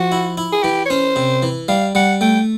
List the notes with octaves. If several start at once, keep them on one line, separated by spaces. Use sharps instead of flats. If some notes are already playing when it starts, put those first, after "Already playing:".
Already playing: F3 F#4
E4
E4
G#4
E3 G4
C#5
C#4 C5
C3
E3
G3 F5
G3 F#5
A3 G5